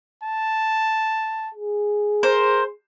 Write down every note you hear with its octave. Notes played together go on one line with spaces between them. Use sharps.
A5
G#4
A#4 C5